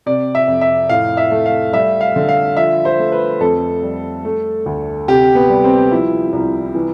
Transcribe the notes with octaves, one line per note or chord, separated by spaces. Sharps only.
C3 D5
E5
F2
E5
A2 F5
E5
A3
F5
G3 E5
F5
D3
F5
F3 E5
C5
A3
B4
F2 A4
G3
A3
D2
C3 G4
B3
G3
C4
F3 E4
C2
E3